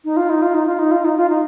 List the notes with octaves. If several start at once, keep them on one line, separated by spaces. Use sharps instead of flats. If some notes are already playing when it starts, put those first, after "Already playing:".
D#4
F4
D#4
F4
D#4
F4
D#4
F4
D#4
F4
D#4